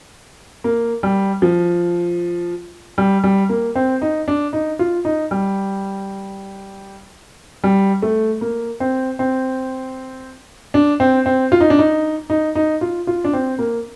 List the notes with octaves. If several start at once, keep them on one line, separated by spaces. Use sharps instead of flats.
A#3
G3
F3
G3
G3
A#3
C4
D#4
D4
D#4
F4
D#4
G3
G3
A3
A#3
C4
C4
D4
C4
C4
F4
D#4
D4
D#4
D#4
D#4
F4
F4
D4
C4
A#3